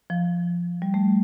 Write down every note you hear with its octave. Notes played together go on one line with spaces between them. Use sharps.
F3
G3
A3